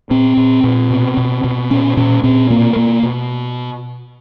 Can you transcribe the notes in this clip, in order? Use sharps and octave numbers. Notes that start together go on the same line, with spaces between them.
A#2 C4
A#2
A#2
B2
B2
B2
A#2 C#4
A#2 C#4
A#2 C4
B2 A#3
B2 A#3
B2